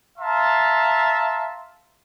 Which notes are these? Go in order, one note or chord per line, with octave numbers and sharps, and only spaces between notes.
E5 F5 A5 A#5 C6